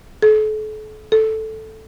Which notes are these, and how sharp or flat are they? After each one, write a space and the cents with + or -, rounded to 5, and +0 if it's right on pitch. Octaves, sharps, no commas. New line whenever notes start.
A4 -40
A4 -5